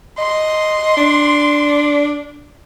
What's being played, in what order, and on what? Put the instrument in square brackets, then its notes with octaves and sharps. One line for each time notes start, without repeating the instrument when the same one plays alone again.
[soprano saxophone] D#5 [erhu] C6
[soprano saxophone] D4